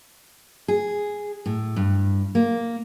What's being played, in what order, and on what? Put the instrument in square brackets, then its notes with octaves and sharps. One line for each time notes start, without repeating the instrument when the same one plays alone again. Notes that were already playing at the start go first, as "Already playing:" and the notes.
[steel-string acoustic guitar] G#4
A2
G2
A#3